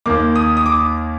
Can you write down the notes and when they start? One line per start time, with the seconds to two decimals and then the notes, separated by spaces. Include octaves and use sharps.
0.06 D#2 D#3 A#3 D6
0.36 D#6
0.57 D#6
0.66 D6